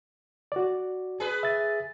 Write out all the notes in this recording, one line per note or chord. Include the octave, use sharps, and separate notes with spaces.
F#4 D5
G#4 B4
E5 A6